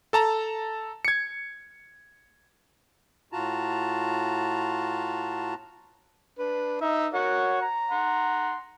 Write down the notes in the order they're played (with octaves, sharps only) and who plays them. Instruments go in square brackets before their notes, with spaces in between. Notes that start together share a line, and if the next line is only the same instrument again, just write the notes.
[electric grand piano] A4 A5 A#5
G#6 C#7
[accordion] A2 F4 F#4 A5 A#5
[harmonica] D4 B4
[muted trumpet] D#4 [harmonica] E5 E6
[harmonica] F#4 A#4 F#5 [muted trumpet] C#5
[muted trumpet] A#5
[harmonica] F#5 C6